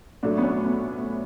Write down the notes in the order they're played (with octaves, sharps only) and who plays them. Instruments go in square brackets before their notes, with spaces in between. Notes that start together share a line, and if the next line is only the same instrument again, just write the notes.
[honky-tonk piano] A2 F#3 A3 D4
B3
C#4
B3